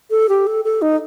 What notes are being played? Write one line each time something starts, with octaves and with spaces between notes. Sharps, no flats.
A4
G4
A4
A4
D#4